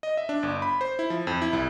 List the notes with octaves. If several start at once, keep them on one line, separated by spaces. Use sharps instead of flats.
D#5
E5
D4
G1
B5
C5
E4
F3
F2
E4
C2